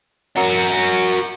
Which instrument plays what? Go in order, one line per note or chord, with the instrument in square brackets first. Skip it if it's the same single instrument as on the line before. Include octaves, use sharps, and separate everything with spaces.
[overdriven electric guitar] F#4 A#4